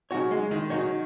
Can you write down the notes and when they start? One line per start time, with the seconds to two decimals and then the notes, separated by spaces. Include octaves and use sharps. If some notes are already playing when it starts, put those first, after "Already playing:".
0.11 C#3 F#3 D#4 F#4 C#5
0.31 G#3
0.51 D#3
0.70 C#3 F#3 D#4 F#4 C#5